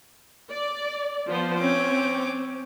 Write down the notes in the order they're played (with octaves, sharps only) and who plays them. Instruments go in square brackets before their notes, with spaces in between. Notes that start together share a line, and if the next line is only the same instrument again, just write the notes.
[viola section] D5
F3 B3 C5
[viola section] C4 [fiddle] C#4 D6